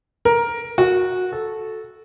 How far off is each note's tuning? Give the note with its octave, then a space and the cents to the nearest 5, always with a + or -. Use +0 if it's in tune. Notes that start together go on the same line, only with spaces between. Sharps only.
A#4 +10
F#4 -15
A4 -10